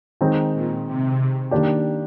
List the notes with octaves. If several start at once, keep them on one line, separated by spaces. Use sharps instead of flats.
D#3 G#3 C4 D#4
A#2
C3
D#3 A#3 D4 G4